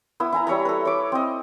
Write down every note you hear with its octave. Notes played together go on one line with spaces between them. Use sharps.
B3 E4 D#6
E4 G#5 A#5
G3 C#5 E5 A#5
A4 B4
C#5 D6
C4 D#5